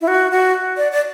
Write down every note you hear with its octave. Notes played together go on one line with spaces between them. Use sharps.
E4
F#4
F#4
D5
D5